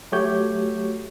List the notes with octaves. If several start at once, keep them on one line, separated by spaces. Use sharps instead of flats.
F#3 A3 F#4 G4 C#5 G6